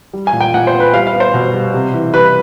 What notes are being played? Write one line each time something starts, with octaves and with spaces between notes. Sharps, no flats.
G3
G#5
A#2
G5
A#2 F#5
C5
B3
B4
G3 F5
F5
B3
C5
B2
G3
C3
E3
G3 B4